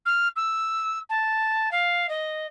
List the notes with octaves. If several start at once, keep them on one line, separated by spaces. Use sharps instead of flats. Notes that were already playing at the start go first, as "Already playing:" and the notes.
F6
E6
A5
F5
D#5